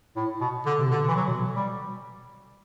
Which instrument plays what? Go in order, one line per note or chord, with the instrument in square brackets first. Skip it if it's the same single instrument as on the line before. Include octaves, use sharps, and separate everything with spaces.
[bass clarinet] A2
B2
D3
[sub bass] C3
[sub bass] B2 [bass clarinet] D3
[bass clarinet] E3
F#3
[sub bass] B2
[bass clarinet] G3